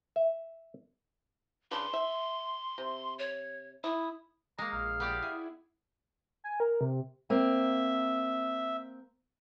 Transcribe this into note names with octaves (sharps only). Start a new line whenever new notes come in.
E5
C#3 D4 B4 C6
E5
C3
C#5
E4 D#6
G#3 A#3 A#5 D#6
A#1 F5
B3 G4 D5
E4 G#4
G#5
A#4
C3
A#3 C4 E5